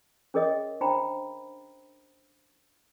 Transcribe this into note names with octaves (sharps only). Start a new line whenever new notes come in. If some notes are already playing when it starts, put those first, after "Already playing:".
C#4 G#4 A#4 C#5 D#5 D#6
D4 C5 F5 G5 A#5 B5